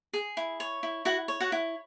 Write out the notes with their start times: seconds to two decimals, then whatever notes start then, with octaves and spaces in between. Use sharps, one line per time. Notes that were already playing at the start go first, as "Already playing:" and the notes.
0.13 G#4
0.37 E4
0.60 C#5
0.83 E4
1.05 E4 F#4 F#5
1.28 C#5
1.40 F#4 F#5
1.52 E4